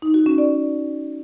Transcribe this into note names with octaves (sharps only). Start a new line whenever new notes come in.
D#4
F#4
C#4
D5